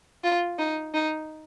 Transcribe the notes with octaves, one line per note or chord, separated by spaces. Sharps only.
F4
D#4
D#4